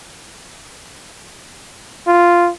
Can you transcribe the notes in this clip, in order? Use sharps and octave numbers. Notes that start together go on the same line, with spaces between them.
F4